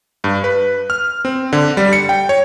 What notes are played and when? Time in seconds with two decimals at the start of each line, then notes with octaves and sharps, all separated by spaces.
0.24 G2
0.44 B4
0.90 F6
1.25 C4
1.53 D3
1.77 G3
1.93 C#7
2.09 G5
2.29 C#5